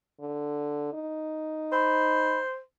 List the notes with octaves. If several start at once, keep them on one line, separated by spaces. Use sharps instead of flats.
D3
D#4
C5 B5